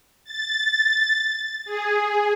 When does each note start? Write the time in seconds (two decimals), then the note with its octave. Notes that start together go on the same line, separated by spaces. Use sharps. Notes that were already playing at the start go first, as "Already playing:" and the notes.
0.24 A6
1.65 G#4